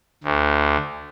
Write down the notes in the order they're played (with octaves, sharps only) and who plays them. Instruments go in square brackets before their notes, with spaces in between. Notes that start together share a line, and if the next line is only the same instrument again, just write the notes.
[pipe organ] D2